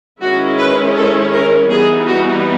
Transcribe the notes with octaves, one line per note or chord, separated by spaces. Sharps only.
D#3 G#3 C#4 E4 F#4
B4
A4
A#4
E3 G3 B3 D#4 G#4
F#4